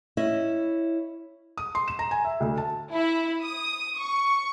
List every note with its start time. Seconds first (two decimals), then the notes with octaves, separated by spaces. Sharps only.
0.17 C#4 E4 D#5 E5
1.57 D#6
1.75 C6
1.88 E7
1.99 A#5
2.11 G#5
2.25 E5
2.40 D2
2.58 A5
2.93 E4
3.42 D#6
3.95 C#6